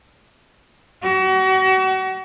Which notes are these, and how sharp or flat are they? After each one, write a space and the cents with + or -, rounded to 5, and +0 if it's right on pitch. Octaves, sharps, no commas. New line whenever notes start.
F#4 +35